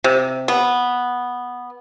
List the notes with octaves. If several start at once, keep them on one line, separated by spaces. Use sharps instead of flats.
C3
B3